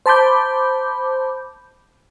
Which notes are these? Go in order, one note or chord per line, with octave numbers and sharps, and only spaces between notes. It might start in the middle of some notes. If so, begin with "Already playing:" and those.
C5 A5 B5 D6 G6